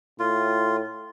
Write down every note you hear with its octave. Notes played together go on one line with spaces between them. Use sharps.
A2 F4